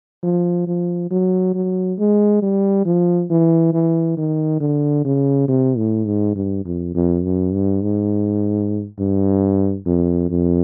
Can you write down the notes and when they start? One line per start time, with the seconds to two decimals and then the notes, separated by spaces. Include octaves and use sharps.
0.23 F3
0.67 F3
1.11 F#3
1.54 F#3
1.99 G#3
2.42 G3
2.85 F3
3.30 E3
3.73 E3
4.17 D#3
4.60 D3
5.05 C#3
5.48 C3
5.77 A2
6.06 G#2
6.36 G2
6.65 F2
6.95 F2
7.24 F#2
7.53 G2
7.82 G#2
8.99 G2
9.86 F2
10.30 F2